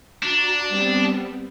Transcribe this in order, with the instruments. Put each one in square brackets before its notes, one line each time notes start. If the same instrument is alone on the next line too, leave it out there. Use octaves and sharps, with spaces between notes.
[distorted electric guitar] D4 [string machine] F#4 A#5
[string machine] G3 B3 C4